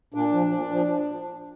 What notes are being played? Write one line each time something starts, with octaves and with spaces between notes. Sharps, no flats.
A#2 D4
F3
A#2
F3